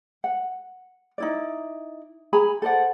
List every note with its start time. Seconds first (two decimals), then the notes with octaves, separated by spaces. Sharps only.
0.24 F#5
1.18 D#4 E4 D5
2.33 G#4 G#5 A#5 B5
2.62 A4 C5 D5 F#5